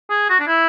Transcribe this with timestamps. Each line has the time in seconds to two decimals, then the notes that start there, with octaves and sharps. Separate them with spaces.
0.10 G#4
0.30 F#4
0.40 D4
0.47 E4